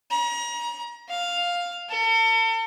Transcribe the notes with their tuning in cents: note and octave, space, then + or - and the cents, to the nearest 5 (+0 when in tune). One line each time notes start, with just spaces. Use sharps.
A#5 +35
F5 +5
A4 +40